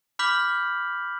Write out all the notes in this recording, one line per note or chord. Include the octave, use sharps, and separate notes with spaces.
B5 D6 F6 G6 B6 F#7